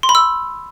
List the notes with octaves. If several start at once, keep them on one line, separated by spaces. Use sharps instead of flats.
C6
B5
E6